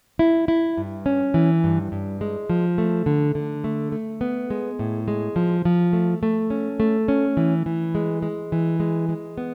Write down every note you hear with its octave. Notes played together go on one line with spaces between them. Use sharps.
E4
E4
G2
C#4
E3
G2
G2
G#3
F3
A3
D3
D3
A3
A3
B3
G#3
A2
G#3
F3
F3
A3
A3
C#4
A3
C#4
E3
E3
G#3
G#3
E3
G#3
G#3
B3